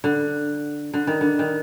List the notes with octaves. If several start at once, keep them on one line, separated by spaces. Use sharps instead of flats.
D3
D3
D#3
D3
D#3